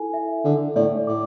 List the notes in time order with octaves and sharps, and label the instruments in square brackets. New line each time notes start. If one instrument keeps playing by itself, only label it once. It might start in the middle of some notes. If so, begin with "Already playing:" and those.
Already playing: [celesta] E4 A4 G#5
E5
[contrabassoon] D3 [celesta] A4
[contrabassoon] A2 [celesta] D5
[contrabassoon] A2 [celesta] D6